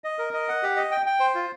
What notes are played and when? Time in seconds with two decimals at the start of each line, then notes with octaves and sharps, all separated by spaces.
0.04 D#5
0.19 A#4
0.33 D#5
0.49 F#5
0.63 G4
0.76 D#5
0.91 G5
1.06 G5
1.20 C5
1.35 F4